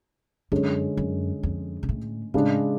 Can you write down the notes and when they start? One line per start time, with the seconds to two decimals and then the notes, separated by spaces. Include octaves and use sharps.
0.52 F#2 D3 G#3 C#4
0.97 F#2
1.43 F2
1.83 B2
1.89 A2
2.34 A2 C#3 G#3 D4